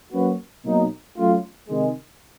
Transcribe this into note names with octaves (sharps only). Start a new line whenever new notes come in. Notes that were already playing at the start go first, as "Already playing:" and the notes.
F#3 A#3 C#4 F#4 B4
B2 F#3 A#3 D#4
F#3 A3 C#4 F4
C3 D#3 G#3